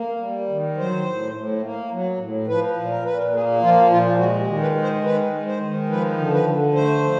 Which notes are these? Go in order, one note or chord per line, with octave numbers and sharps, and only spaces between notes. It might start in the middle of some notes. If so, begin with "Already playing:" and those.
Already playing: A#3
G3
D#3
F#3 C5
A2
A2
A#3
F#3
A2
F3 B4
A#2
A#4
A#2 B4
A#4
A#3 G#4
F3 F4
A#2 F4
G#3 F#4
G4
D#3
B4
G#3
C5
D#3 B4
G#3
C5
D#3
F3 B4
D3
B4
D3
A3 C5
F3